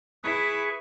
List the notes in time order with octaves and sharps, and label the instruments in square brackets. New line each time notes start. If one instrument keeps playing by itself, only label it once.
[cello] E4 [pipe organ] G#4 B4 C#6